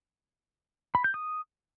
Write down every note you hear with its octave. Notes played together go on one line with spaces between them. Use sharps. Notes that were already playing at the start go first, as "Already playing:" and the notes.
B5
G6
D#6